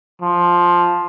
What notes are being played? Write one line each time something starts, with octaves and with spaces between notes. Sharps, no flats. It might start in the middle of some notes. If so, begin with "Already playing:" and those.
F3